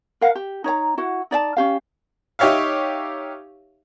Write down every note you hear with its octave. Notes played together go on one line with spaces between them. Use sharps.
A#4 F5 F#5
G4
D#4 C#5 D5 A#5
E4 F#4 F#5
D#4 D5 E5 A5
C#4 G4 F5
D#4 G4 C#5 E5 F5